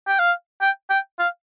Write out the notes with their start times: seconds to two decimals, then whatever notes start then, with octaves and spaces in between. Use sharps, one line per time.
0.08 G5
0.19 F5
0.61 G5
0.90 G5
1.19 F5